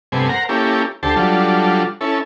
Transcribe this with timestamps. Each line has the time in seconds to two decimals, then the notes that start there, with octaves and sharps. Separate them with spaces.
0.12 G2 C3 A3 B3 C4 G#5
0.29 A#4 C5 F#5 A#5
0.49 A#3 C#4 E4 G4 A4
1.03 D2 G4 A4 C5 A5
1.16 F#3 G3 D4 F4 A4
2.01 C#4 E4 A4